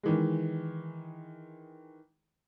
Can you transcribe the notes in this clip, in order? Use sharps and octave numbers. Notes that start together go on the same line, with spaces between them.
D#3 E3 G#3